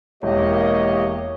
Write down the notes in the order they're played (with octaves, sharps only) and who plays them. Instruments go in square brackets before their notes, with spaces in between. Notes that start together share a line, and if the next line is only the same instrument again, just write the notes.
[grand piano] E1 [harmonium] A#3 G4 D#5 [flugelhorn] C#5